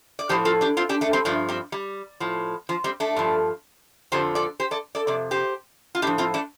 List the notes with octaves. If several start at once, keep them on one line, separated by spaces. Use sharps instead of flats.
D5
A2 F3 G4 C5
F4 A4
D4 G4
C4 F4
D4 G4
A3 D4
G3 C4
G2 F3 A3 D4
G3 C4
G3
A2 F3
F3
G3 C4
A3 D4
G2 F3
F2 D3 F3 G4 C5
A4 D5
G4 C5
A4 D5
A4 D5
F2 C3 D5
G4 C5
F4
A2 F3 D4 G4
C4 F4
A3 D4